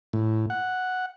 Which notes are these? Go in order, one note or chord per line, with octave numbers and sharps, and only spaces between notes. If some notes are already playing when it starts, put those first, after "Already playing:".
A2
F#5